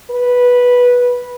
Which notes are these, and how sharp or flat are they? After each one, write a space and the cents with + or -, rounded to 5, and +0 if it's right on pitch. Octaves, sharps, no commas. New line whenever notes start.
B4 -10